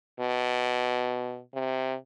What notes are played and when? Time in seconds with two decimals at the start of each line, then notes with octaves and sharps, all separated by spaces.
0.20 B2
1.55 C3